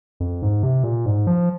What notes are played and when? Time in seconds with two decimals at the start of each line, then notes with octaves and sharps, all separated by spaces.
0.20 F2
0.42 G#2
0.63 C3
0.84 A#2
1.06 G#2
1.27 F3